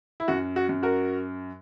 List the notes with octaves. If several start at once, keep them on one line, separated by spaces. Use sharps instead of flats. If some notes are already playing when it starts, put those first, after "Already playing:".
E4
F#2 F#4
F#4
F#2
F#4 A#4